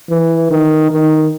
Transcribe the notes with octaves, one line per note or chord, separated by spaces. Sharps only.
E3
D#3
D#3